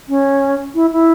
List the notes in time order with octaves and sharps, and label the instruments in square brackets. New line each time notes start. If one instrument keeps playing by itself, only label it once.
[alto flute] C#4
E4
E4